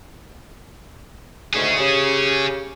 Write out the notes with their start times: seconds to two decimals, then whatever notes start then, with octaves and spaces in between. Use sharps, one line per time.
1.54 D2 G#2 A3 C#4 G#4
1.78 C#3 G4